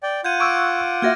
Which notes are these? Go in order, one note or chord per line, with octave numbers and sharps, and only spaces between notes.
D5 G5
F4 F#5 G6 G#6 D#7
C#6 D6 E6 F#6 G#6 D7
A#3 F#4 E5 F6 G#6 A#6